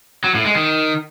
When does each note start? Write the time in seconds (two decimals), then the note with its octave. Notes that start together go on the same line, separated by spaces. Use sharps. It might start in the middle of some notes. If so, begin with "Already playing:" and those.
0.24 F#3
0.35 A2
0.45 G#3
0.55 D#3